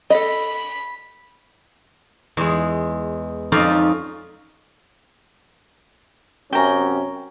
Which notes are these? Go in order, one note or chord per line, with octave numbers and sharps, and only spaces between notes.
A4 D#5 B5
E2 G#3
F2 C#4 D#4 F4 D5
F#2 C3 C#4 G5 A#5